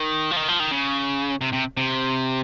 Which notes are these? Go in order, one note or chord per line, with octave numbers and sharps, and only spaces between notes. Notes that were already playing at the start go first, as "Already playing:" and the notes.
Already playing: D#3
F3
D#3
F3
D#3
C#3
C3
C3
C3